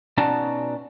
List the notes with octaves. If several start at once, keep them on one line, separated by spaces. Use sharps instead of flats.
B2 C#4 D#4 F#4 D5 A5